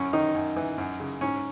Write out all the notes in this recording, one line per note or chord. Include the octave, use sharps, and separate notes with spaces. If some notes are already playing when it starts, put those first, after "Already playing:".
Already playing: F#2 C#4
D#3 D#4
F#2
E3
F#2
C#3
G#2 C#4